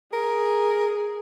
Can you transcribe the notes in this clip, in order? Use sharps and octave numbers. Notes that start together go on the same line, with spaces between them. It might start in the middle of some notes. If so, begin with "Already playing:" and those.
G#4 A#4